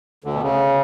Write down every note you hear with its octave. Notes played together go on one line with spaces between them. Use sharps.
D2 D3
B2
C#3